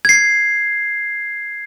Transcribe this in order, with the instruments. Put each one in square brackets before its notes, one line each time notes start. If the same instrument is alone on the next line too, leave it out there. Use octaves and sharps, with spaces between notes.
[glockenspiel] G#6 C7